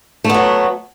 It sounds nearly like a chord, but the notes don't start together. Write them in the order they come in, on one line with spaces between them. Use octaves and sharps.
A3 B3 F#3